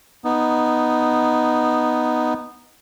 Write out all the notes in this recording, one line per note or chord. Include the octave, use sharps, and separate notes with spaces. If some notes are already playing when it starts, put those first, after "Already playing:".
B3 D#4